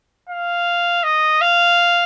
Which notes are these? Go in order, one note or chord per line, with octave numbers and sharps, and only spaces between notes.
F5
D#5
F5